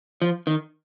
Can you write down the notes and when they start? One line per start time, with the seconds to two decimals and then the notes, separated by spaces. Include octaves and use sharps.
0.22 F3
0.47 D#3